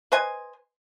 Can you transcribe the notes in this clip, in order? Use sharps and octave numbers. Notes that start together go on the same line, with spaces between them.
B4 C5 D#5 G#5